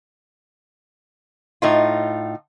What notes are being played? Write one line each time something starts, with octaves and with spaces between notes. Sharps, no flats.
A2 D#4 F4